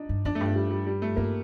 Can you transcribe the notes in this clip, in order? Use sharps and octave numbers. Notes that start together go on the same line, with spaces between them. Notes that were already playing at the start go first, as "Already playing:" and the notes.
Already playing: D4 D#4
G2
F2 D4
A3
G2
A3
G3
G3
G3
A3
G2 A#3